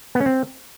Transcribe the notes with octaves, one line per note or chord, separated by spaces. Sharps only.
B3
C#4
C4